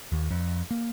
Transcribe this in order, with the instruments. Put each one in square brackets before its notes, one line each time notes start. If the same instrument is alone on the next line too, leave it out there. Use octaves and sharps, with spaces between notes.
[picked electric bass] D#2
F2
A#3